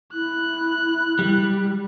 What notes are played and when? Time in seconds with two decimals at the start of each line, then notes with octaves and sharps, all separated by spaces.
0.13 E4 F#6
1.19 G3